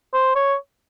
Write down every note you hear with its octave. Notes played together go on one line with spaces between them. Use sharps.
C5
C#5